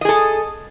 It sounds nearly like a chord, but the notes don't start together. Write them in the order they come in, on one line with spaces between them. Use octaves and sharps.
D#5 G#4 A4